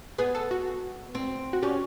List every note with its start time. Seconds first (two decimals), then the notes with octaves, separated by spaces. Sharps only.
0.18 B3 G#4
0.35 A4
0.51 F#4
1.15 C4
1.53 F#4
1.62 C#4 G4